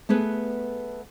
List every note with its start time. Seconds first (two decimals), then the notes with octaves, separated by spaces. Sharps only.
0.09 A3 B3 G#4 B4